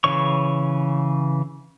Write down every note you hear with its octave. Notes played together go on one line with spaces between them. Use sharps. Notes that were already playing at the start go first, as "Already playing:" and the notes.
C#3 E3 C#5 C#6